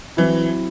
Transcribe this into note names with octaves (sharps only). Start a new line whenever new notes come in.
E3 F#3 C4 E4